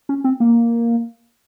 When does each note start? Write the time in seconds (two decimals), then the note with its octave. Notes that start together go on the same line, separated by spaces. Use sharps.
0.09 C#4
0.24 C4
0.40 A#3